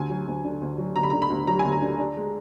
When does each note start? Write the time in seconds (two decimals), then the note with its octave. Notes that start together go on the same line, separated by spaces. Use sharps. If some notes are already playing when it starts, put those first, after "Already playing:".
Already playing: D2 G#5
0.10 F#3
0.27 D2
0.44 D3
0.61 D2
0.78 F#3
0.96 D2 A#5
1.03 B5
1.10 A#5
1.13 D3
1.22 B5
1.30 D2
1.47 F#3 A#5
1.59 D2 G#5
1.72 A#5
1.82 D3
1.99 D4
2.17 G#3